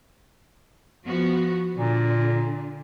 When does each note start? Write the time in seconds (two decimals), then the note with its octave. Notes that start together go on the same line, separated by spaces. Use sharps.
1.06 F3 B3 F#4
1.78 A#2 D3